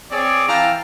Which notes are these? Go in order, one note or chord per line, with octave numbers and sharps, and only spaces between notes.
C4 G#4 C#5 D5
E3 F5 G5 A5 A#5